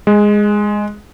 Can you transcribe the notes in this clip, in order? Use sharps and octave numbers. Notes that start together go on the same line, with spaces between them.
G#3